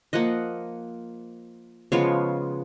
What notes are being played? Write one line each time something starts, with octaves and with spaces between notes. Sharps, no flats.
F3 A#3 D#5 F#5
C#3 F3 G#3 B3 C#5 F5